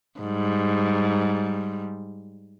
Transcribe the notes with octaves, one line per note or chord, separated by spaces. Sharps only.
G#2 G3